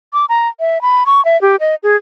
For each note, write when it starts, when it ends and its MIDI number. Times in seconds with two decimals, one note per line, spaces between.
0.13 0.25 86
0.29 0.48 82
0.60 0.81 76
0.82 1.04 83
1.06 1.23 85
1.25 1.40 76
1.42 1.56 67
1.60 1.75 75
1.83 1.96 68